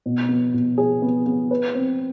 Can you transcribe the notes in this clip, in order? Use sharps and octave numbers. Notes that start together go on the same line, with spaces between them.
B2
B3
B2
G#4
B3
B3
B4
C4